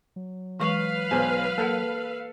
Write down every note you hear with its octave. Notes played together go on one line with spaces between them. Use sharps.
F#3
E3 G#3 B4 F5 C#6
B1 C5 G#5
A#3 A4 A#4 F#5